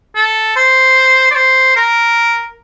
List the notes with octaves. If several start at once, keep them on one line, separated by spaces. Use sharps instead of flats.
A4
C5
D5
C5
A#4